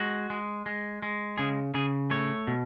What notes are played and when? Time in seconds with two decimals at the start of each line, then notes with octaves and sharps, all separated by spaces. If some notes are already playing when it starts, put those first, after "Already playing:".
Already playing: G#3 F#4
0.30 G#3
0.66 G#3
1.02 G#3
1.38 C#3 G#4
1.74 C#3 G#4
2.11 A3 C#5
2.47 B2